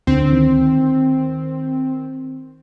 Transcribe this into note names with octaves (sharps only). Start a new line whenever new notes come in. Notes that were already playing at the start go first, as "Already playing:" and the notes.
D2 D3 C4
D#3